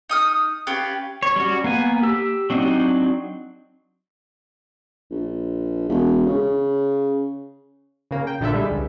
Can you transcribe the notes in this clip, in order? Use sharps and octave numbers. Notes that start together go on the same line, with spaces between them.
D#4 D#6 F6
C#4 F4 G4 B4
C#5
G3 C#4 F#4
A#3 B3 G#5
G4 E6
F#3 C4 D4 D#4 F#4
A#1
E1
C#3
C#3 A#3
G5
A#1 D3 A3 A4 E5
G3 G#3 E4
C#2